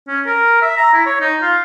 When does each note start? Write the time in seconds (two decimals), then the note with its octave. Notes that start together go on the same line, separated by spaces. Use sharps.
0.08 C#4
0.26 A#4
0.62 E5
0.77 A#5
0.94 E4
1.06 C#5
1.21 D#4
1.42 F4